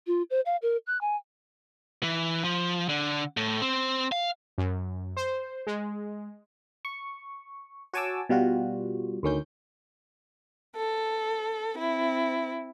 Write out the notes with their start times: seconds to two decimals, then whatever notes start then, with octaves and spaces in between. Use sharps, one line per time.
0.07 F4
0.30 C5
0.46 F5
0.62 A#4
0.87 F#6
1.01 G#5
2.03 E3
2.44 F3
2.89 D3
3.37 A2
3.62 C4
4.12 F5
4.58 F#2
5.17 C5
5.67 G#3
6.85 C#6
7.94 F#4 C#5 G#5 A5 D6 E6
8.29 B2 G3 F4 F#4
9.23 D2 D#3 C#4 G6
10.76 A4
11.78 C4 E4